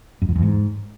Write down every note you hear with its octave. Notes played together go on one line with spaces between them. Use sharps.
F#2
F2
E2
G#2